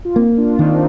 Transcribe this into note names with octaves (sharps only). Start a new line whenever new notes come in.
F4
A#3 C4 D#4
D4 F4
D#3 C4 D#4